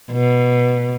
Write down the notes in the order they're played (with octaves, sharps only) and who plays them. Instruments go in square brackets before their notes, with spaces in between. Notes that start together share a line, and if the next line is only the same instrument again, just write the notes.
[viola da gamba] B2